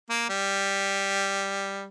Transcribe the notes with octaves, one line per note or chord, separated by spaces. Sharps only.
A#3
G3